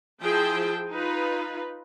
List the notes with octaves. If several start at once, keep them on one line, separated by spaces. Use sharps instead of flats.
F3 E4 G#4 C5 G5 A5
D#4 F4 B4